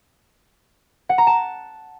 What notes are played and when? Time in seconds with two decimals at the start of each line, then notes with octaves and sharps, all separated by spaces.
1.09 F#5
1.18 A#5
1.27 A5